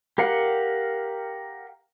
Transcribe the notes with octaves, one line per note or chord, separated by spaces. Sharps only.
G4 A#4 F5 F#5